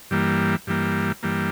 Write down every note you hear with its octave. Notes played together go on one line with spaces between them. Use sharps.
G2 E3 G3 A#3
G2 E3 G3 A#3
G2 E3 G3 A#3